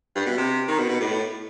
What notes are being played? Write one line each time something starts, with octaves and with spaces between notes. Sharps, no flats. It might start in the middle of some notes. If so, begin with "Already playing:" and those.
G2
B2
C3
D#3
B2
B2
A2